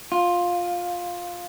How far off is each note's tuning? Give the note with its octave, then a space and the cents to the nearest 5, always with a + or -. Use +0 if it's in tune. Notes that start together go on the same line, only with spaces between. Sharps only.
F4 +10